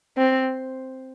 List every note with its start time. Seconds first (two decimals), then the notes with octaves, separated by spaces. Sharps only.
0.18 C4